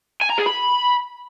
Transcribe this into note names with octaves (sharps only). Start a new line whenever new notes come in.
G#5
A#5
G#4
B5